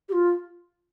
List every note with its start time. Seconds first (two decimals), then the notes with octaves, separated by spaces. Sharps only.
0.09 G4
0.13 F4